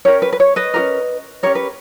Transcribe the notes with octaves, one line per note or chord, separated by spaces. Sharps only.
C#4 G4 A#4 C#5
B4
B4
C#5
B4 D#5
C#4 G4 A#4
C#4 G4 A#4 C#5
B4